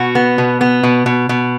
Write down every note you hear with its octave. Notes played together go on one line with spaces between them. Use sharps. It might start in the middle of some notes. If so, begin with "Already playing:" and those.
Already playing: B2 F#4
B3
B2
B3
B2
B2
B2